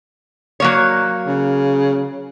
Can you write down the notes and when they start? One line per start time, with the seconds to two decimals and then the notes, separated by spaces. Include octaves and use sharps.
0.60 F#3 A#3 C#5
1.27 C#3